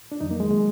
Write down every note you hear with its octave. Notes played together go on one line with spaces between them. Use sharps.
D4
F2 D#3 F#3 D#4
A#3
G#3
D#3 F#3 G#3